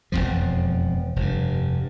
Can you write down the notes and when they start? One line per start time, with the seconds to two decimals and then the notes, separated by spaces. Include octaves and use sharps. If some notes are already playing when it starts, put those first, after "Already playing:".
0.12 E1 C2 F2 F3
1.16 F1 G2